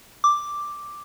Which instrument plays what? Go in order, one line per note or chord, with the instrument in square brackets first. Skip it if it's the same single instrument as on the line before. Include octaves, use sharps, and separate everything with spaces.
[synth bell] D6